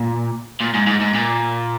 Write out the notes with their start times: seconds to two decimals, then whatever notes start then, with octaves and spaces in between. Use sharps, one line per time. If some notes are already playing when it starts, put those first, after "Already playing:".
Already playing: A#2
0.61 A#2
0.74 G#2
0.87 G#2
1.01 G#2
1.14 A#2